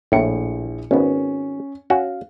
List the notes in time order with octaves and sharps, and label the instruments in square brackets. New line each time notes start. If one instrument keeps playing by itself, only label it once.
[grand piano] A#1 E4 C#7 [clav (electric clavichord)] A2
[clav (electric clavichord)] G#1 B3 [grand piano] C#4
[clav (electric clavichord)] C#4 F#4 [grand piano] F5